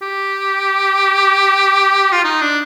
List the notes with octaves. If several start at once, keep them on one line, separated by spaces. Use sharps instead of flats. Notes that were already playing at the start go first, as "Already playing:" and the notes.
G4
F4
D#4
D4